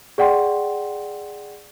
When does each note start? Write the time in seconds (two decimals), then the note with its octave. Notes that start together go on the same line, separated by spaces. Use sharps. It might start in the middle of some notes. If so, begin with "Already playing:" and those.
0.18 G#4 D5 F#5 G5 C6